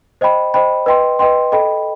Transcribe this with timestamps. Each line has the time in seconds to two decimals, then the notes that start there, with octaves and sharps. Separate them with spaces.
0.21 C5 D#5 G5 B5
0.54 C5 D#5 G5 B5
0.86 B4 D#5 G5 C6
1.19 B4 D#5 G5 C6
1.52 A4 D#5 G5 B5